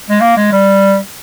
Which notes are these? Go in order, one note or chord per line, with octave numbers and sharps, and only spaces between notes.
G#3
A#3
G#3
G3